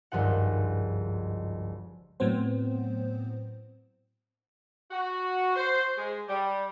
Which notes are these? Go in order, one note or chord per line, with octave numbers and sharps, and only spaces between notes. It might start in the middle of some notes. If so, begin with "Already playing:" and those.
G#1 C#2 G2 F3 F4 F#5
A2 F#3 B3 C4 C5
F#4
C5
G#3
G3